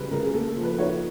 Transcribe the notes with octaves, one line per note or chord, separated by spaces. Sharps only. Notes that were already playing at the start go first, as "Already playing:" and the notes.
Already playing: C#3 G3 B4
C#3 A#4
G#4
A#3 A4
A4
F3
B4
D#4 C#5